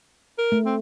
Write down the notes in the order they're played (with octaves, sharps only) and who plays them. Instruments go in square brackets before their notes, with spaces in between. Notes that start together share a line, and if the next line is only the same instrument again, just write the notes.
[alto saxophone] A#4
[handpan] A3
[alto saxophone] C4